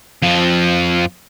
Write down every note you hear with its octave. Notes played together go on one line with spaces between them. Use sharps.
F2 F3